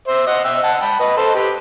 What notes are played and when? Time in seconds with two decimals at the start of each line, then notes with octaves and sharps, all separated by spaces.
0.08 C5 E5
0.27 D#5 F#5
0.45 E5 G5
0.63 F#5 A5
0.81 G5 B5
1.00 B4 D#5
1.17 A4 C5
1.35 G4 B4